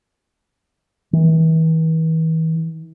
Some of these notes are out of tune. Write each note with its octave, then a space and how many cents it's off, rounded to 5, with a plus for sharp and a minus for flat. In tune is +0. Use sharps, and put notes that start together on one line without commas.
E3 -40